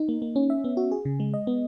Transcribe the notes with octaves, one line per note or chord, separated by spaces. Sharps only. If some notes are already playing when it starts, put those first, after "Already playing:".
Already playing: D#4
A#3
A#3
C#4
E5
B3
F#4
G#4
C#3
G#3
D#5
B3